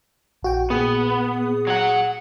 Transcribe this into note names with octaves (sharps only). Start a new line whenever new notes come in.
A#1 F#4 G5
A#2 B3 G#4 D#6
F#3 F#5